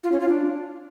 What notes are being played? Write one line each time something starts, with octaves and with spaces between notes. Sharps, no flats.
F4
C#4
F4
D4